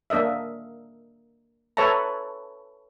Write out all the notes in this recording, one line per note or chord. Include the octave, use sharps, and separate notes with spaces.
A#3 D4 A#4 D#5 E5
A4 B4 C#5 E5 A5 A#5